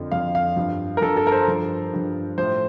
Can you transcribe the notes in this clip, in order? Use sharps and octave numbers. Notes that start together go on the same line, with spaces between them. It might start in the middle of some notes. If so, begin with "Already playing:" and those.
Already playing: F2 D3 F3
F2 D3 F3 F5
F5
G2 F3
A#4
G2 F3 A4
A4
A#4
C5
G2 F3
G2 F3
A2 F3 C5